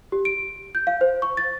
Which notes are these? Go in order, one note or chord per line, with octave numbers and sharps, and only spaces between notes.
G4
D7
G6
F5
C5
C#6
A6